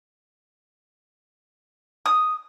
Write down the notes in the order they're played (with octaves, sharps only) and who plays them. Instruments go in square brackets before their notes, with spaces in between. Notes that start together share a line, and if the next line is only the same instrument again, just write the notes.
[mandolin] D#6